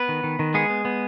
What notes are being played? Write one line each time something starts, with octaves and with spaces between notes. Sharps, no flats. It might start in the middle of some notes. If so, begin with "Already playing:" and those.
Already playing: B3 B4
D#3
D#3
D#3
G#3 B3 G#4
B3
B3